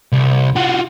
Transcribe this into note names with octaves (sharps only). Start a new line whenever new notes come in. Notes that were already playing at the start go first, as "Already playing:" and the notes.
C2
F4 F#4